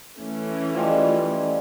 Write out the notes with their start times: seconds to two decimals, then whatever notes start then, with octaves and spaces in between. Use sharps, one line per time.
0.18 E3 A3 C#4
0.74 F3 G3 G#3